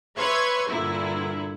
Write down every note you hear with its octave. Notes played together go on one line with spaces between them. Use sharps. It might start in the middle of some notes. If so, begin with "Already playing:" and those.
B4 C#5 E5 C6 C#6 G#6
G2 A#2 D3 E4